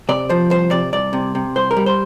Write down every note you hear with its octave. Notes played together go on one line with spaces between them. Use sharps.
C3 D5
F3 C5
C2 C5
C3 D5
C2 D5
C3
C3
C2 C5
A#4
G3
C5